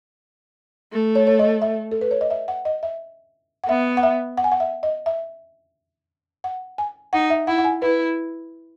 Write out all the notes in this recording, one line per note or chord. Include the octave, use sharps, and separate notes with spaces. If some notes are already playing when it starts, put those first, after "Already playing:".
A3
C#5
C#5
D#5
E5
A4
B4
C#5
D#5
E5
F#5
D#5
E5
F#5
B3 E5
F#5
E5
F#5
G#5
F#5
E5
D#5
E5
F#5
G#5
D#4 F#5
E5
E4 F#5
F#5
G#5
E4 B4